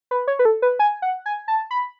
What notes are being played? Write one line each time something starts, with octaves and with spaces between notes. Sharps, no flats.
B4
C#5
B4
A4
B4
G#5
F#5
G#5
A5
B5